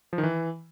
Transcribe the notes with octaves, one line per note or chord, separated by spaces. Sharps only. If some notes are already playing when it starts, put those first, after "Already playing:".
F3
D#3
E3